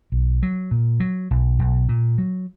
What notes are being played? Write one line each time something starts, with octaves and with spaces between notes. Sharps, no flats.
B1
F#3
A#2
F#3
B1
B1
A#2
F#3